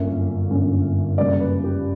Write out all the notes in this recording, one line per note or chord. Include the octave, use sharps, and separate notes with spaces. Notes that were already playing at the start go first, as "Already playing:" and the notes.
Already playing: G1 F#2 D3 A#3 C#4 E5
G1 F#2 D3 A#3 C#4
F#2 C#3 G3 A#3 D5
B4
G4